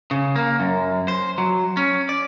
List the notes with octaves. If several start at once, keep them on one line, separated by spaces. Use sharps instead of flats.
C#3
A#3
F#2
C5
F#3
C#4
D5